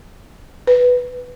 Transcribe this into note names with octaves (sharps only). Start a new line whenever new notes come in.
B4